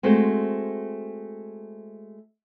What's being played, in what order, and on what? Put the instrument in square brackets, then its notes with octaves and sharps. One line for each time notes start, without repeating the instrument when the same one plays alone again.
[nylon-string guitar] G#3 A3 C4 F#4 C5